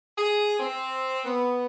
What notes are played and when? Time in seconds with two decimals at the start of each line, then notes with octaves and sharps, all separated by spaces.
0.17 G#4
0.60 C4
1.25 B3